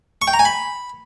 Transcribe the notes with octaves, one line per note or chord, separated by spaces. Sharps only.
C#6
G5
A#5
G#5
B5